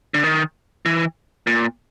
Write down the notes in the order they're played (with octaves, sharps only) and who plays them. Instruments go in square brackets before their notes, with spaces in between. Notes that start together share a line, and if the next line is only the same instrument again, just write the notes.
[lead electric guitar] D3
D#3
E3
A#2